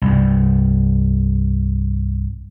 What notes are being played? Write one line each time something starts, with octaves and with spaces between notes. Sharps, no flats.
C2 G2